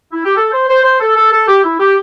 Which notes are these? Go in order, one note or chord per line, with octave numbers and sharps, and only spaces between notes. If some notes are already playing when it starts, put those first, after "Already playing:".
E4
G4
A4
C5
C5
C5
A4
A4
A4
G4
E4
G4